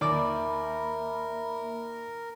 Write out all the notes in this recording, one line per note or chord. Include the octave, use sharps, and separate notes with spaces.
D#2 A#3 A#4 D5 E5 B5 D6